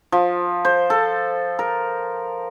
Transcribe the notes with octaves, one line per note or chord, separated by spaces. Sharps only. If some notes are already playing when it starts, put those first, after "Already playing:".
F3
C5
A4
A#4